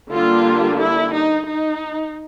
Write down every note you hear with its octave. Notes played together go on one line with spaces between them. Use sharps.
D3 G3 A#3 D4 F4
E4
D#4
D#4